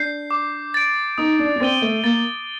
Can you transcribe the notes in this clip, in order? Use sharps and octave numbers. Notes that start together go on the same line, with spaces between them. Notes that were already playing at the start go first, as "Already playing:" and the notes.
Already playing: D4 G6 C7
D6
A6 D7
D#4 D#6
D4
D4
C4 A6 D#7 G7
A3
A#3 A6